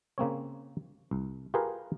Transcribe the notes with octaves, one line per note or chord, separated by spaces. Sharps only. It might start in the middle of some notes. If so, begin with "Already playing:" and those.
C#3 A#3 C4 C#5
C2
F4 G4 G#4 A#4 B4 F5